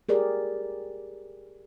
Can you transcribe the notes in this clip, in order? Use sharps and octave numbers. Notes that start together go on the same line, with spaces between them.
G4 G#4 A#4 D5